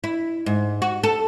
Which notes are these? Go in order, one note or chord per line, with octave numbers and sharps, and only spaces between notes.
E4
G#2
F#4
A4